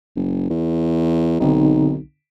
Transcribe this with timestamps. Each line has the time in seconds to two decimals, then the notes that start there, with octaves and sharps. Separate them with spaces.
0.16 F#1
0.50 E2
1.40 B1 D3 C4 D#4